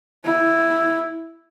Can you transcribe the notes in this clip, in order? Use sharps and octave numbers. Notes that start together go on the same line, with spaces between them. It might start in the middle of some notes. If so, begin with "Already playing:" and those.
E4